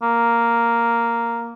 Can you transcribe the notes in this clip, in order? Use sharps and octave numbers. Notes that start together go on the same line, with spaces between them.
A#3